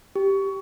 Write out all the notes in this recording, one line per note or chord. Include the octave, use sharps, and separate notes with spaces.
G4